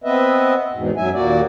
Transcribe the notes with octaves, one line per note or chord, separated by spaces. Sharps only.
B3 C4 B4 D#5 E5
E2 G#2 B2
F#2 F#3 E5 G#5
D#2 A#2 A#3 F#4 D5